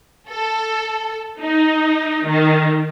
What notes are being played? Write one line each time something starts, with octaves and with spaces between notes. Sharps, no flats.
A4
D#4
D#3